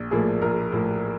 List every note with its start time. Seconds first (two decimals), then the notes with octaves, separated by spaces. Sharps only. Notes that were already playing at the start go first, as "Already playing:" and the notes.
Already playing: A#1
0.11 A2 F3 A#3 G#4
0.41 A#1 A#4
0.72 A2 F3 A#3